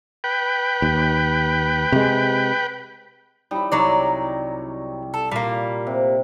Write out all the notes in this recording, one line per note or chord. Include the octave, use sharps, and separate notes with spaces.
B4 G5
D#2
C3 G#3
G3 D#4 E4
C2 F#3 D#4 C#5 D5
A4
A#2 G3 A#3
C3